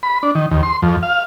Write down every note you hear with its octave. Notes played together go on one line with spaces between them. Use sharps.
B5
D4
D#3
D#2
C6
F2
F5